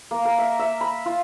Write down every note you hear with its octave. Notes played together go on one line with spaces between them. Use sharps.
A#3
A#4
E5
E5
B5
F4